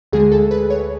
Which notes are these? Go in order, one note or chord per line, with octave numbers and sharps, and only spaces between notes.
D2 D3 G#3 G#4
A4
B4
C#5